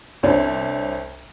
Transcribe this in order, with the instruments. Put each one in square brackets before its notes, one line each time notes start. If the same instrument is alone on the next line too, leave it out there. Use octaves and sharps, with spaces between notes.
[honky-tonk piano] C2 C#4 D4 C5